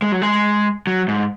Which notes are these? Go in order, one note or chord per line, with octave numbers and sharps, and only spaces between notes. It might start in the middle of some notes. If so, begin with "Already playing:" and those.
G#3
F#3
G#3
F#3
G#2